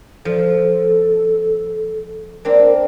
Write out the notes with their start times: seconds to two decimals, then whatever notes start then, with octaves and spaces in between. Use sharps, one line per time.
0.25 F3 A4
2.45 A#3 C4 D4 A#4